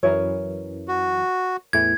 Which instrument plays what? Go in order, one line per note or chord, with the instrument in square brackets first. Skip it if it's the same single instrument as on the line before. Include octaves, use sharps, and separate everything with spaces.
[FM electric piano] F#2 E3 [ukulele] A#4 C#5
[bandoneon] F#4
[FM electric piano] E2 A2 E3 [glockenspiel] G#6